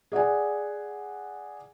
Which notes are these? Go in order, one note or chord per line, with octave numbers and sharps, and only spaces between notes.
G#4 D5 F#5 G#5